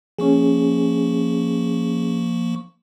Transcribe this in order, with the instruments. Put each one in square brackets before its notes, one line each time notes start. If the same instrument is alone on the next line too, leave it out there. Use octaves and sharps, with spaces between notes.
[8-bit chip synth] F3 A#3 C#6 [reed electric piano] C#4 G#4